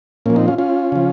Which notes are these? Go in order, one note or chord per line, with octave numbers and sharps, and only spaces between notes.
A#2 F3 A#3 C#4
C4 D#4
C#4 F4
C#4 F4
C#3 F3